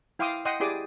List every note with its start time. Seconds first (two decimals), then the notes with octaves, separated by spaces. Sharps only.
0.19 E4 F5 G5 C6 D6 D#6
0.45 D#5 F#5 G5 C6 D#6
0.60 E4 G4 G#4 D5 D6 D#6